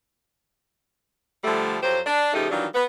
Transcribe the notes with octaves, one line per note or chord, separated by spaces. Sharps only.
D3 F3 G3 A3
F2 F#3 G4 C5
D4
C#3 F3 A3 D#4 G4
D#3 E3 F#3 G3 D4 F4
B3 B4